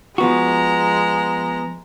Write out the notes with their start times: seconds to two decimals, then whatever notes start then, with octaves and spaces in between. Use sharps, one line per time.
0.18 F3 G#3 B3 F#4 A#5